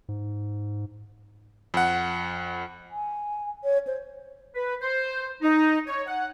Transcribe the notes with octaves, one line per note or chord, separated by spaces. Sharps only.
G#2
F2 F#5
G#5
C#5
C5
B4
C5
D#4
C#5
F#5